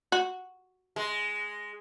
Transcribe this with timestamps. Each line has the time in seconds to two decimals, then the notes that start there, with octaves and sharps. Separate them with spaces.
0.12 F#4
0.96 G#3